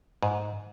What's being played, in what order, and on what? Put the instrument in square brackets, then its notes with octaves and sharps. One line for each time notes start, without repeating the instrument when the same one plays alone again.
[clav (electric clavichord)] G#2